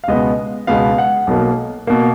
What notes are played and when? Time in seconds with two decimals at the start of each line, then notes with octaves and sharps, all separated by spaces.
0.04 F5
0.08 C#2 B2 G#3 B3 D#5
0.67 C#2 B2 G#3 B3 F5
0.98 F#5
1.27 B1 B2 A#3
1.87 B2 A#3